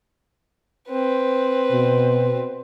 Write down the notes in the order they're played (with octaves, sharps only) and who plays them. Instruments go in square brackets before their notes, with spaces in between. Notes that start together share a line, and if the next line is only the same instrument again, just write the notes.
[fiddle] C4 B4
[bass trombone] B2